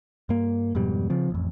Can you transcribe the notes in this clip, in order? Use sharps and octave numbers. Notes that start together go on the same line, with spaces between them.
G2 A#3
F2 G#2 B2 G3
C#3 F3 C4
A1 F2